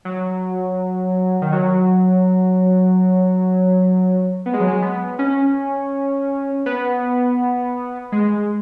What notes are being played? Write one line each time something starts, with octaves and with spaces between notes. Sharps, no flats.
F#3
D#3
F#3
B3
G#3
F#3
G#3
B3
C#4
B3
G#3